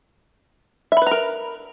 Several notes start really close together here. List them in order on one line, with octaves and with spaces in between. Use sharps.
E5 B5 B4 A#5 A#4